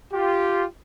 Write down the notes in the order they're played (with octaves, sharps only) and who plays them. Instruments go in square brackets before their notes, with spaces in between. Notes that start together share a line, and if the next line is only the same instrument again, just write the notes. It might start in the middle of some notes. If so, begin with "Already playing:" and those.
[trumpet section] F4 G4